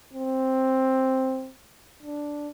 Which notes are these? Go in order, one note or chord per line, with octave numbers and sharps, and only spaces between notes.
C4
D4